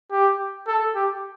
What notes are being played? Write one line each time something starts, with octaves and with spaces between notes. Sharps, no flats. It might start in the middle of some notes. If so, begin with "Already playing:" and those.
G4
A4
G4